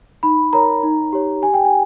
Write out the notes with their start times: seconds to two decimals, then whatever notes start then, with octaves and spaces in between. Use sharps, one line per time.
0.23 D#4 B5
0.53 A#4 C#5 A#5
0.83 D#4
1.13 G4 C#5
1.42 G4 G#5
1.54 G5
1.65 G#5